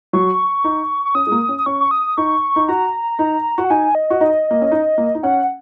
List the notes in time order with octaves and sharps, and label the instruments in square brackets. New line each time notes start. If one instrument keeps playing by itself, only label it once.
[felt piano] F#3 [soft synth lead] C#6
[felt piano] D#4
[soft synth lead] C#6
[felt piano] C#4 [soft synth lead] D#6
[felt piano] G#3
A#3
C#4
[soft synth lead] D#6
[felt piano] C#4 [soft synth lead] C#6
[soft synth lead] C#6
D#6
[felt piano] D#4 [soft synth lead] C#6
[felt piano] D#4
[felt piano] F#4 [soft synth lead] A#5
[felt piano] D#4
F#4
[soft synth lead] F#5
[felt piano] D#4 [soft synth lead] G#5
[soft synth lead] D#5
[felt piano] F#4
[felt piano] D#4 [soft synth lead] D#5
[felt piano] A#3
C#4
D#4
A#3
D#4
[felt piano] C#4 [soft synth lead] F#5